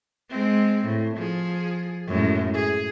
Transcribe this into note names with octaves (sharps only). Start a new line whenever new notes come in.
G#3 C4
A2
F3 G#4
F#2 A2 G#3
G#4